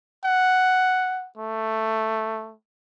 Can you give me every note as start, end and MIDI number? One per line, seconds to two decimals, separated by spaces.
0.24 1.28 78
1.37 2.54 57